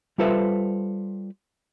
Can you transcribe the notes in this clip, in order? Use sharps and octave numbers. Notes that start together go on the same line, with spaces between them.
G3 F4 A4 B4 C5 E5